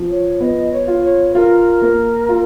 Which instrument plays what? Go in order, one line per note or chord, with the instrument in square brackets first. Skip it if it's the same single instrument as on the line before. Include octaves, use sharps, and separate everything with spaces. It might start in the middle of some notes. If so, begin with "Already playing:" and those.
Already playing: [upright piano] F3
[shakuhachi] C#5
[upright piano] B3 [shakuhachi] D#5
[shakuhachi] C#5
[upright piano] F4
[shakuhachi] C#5
[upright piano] F4 [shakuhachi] A#4
[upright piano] A#3
F4